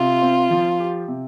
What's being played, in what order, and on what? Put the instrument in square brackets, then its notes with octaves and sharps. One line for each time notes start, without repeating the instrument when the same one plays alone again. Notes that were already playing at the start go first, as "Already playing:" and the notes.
Already playing: [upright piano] C3 [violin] F4
[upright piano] C4
F3
G4
C3